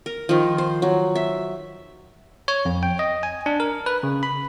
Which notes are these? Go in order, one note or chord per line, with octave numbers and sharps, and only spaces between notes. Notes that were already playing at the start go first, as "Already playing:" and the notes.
A#4
D#3 F3
C5
F#3
E5
C#5
F2
G5
D#5
G#5
D4
A#4
B4
C#3
B5